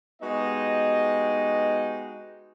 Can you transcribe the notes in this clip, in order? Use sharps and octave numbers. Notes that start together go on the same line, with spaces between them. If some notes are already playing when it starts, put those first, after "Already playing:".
G#3 B3 D#4 F#4 G4 D#5